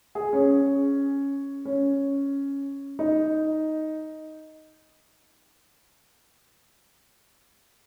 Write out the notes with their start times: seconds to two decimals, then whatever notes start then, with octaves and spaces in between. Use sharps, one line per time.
0.15 G#4
0.33 C#4
1.65 C#4
2.99 D#4